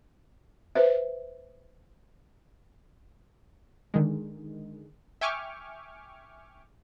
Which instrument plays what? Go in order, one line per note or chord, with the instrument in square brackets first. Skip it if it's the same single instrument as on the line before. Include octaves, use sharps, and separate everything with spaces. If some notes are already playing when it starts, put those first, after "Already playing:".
[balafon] B4 C5 E5
[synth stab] D3 D#3 G#3
E5 G5 G#5 C#6 D6 F6